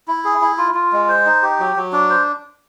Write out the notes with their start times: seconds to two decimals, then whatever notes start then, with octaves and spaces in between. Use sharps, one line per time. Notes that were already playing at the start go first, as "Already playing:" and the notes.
0.08 E4
0.25 G#4
0.41 E4
0.58 F4
0.75 F4
0.92 G#3
1.09 C5
1.26 D#4
1.43 G4
1.60 F#3
1.76 F#3
1.93 D4
2.10 C5